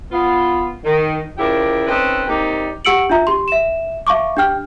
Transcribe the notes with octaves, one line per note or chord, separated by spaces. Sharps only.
B3 F4
D#3
C#3 F3 D4 E4 G4 A#4
C4 C#4 D#4 A4 B4
A#3 C4 D4 D#4 G4
G4 F#5 E6 C#7 D7 F#7
D4 F4 E5 A#5
G4 C6
E5 E7
E5 F5 A5 C#6 D6
D4 G4 G5 F6